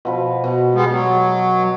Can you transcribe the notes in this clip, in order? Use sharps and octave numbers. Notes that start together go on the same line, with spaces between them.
B2 F3 B4
B2
G3 G#3 B3
F#3